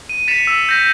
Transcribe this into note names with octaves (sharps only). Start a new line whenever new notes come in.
D#7
A6 B6 C#7 E7 F7
E6
G6 A#6 B6